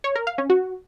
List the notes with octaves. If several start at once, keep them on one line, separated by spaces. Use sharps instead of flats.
C#5
A#4
F5
C#4
F#4